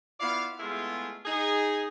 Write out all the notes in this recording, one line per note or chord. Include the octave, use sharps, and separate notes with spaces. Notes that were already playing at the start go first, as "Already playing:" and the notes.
B3 E4 F4 D5 F5
G#3 A3 B3 E4 F4 G#4
D#4 G#4